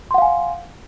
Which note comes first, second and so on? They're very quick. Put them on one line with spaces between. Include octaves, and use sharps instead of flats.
C6 F#5 F5 G#5